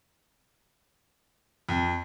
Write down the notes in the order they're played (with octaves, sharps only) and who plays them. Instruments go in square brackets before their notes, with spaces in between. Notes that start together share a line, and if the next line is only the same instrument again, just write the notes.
[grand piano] F2